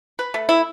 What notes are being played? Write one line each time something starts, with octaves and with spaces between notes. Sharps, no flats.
B4
A3
E4